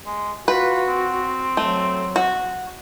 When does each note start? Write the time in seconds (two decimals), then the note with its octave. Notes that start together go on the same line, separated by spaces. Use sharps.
0.06 G#3
0.48 F4 F#4 B4
0.88 C4
1.57 F#3 A3
2.16 F#4